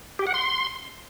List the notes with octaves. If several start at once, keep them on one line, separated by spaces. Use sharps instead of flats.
G4
F#5
C6